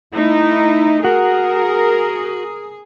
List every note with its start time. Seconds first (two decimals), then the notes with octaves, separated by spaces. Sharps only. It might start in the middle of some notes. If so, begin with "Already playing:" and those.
0.14 A3 D#4 E4
1.05 F#4 G#4 A#4